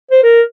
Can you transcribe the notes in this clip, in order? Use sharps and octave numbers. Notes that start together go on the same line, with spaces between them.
C5
A#4